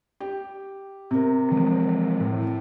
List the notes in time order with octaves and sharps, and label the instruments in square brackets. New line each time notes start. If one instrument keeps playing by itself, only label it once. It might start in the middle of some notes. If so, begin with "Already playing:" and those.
[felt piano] G4
C3 A#4
[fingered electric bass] E3 F3 G#3
A2